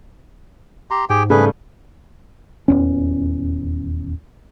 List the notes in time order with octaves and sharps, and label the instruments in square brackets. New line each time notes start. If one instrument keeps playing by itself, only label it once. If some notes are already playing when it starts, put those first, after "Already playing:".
[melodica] G4 A#5 C6
[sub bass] G#2 [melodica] G4 G#4 G5
[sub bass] G#2 [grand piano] C#3 G3 A3 [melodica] G#4 B4
[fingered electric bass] D#1 E2 C#4